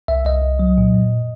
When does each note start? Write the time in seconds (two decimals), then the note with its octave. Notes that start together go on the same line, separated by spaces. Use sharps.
0.08 C2 E5
0.25 C2 D#5
0.43 C2
0.59 F#3
0.78 A#2
0.94 F#2